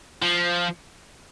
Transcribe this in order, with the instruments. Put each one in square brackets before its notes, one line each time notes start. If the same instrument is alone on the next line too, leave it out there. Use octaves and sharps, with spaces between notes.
[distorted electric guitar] F3